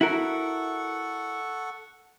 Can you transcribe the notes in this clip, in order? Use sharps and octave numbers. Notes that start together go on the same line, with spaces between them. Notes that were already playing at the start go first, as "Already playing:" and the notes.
E4 F#4 A4 A#4 F#5 C#6